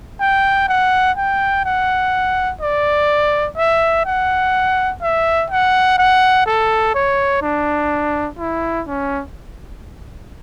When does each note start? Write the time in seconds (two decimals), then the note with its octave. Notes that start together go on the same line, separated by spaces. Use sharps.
0.20 G5
0.68 F#5
1.17 G5
1.65 F#5
2.61 D5
3.58 E5
4.06 F#5
5.02 E5
5.50 F#5
5.98 F#5
6.46 A4
6.95 C#5
7.42 D4
8.39 E4
8.87 C#4